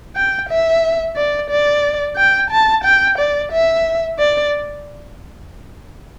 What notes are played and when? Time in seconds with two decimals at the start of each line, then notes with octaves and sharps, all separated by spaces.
0.16 G5
0.49 E5
1.16 D5
1.50 D5
2.17 G5
2.51 A5
2.84 G5
3.18 D5
3.52 E5
4.19 D5